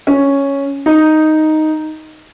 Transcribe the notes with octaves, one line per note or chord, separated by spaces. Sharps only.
C#4
D#4